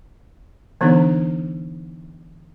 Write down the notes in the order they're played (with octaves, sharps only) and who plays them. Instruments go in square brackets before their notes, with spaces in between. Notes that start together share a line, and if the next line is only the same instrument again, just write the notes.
[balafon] D3 E3 B3 D4 D#4